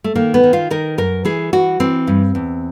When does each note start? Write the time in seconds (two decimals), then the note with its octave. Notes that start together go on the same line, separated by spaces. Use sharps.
0.04 A3
0.15 D#3 A#3
0.34 B3
0.44 D#3
0.53 F4
0.70 D#3 A#4
0.98 F#2 A#4
1.25 E3 G#4
1.53 E3 F#4
1.80 E3 C4
2.07 G2
2.35 E2